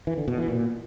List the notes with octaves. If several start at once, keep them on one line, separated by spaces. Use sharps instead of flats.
E3
D3
B2
E3
A#2